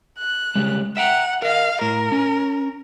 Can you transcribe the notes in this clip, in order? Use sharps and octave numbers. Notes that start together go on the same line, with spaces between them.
F#6
C#3 G3 G#3
E5 F#5 G5 A#5
A#4 D#5 F5
A2 A#4
C#4